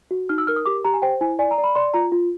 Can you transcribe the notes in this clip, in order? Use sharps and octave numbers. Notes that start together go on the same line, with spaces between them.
F#4
D#4 F6
E6
A#4 F6
D#6
G4 D6
G4 A#5
G#5
C5 G5
E4 G#5
D5 G#5
A#5
D5
B5
D5 C6
F4 A#5
F4